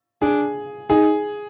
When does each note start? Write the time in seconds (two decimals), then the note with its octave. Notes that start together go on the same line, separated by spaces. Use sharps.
0.22 D4 G#4
0.90 D#4 G#4